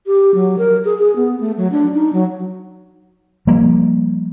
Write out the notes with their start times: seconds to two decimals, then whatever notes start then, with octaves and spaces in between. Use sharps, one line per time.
0.07 G4
0.34 F#3
0.58 A#4
0.85 G#4
0.99 G#4
1.16 B3
1.40 A3
1.57 F#3
1.72 D4
1.95 D#4
2.13 F#3
3.47 F3 G3 A#3